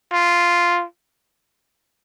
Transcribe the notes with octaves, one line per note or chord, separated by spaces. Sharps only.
F4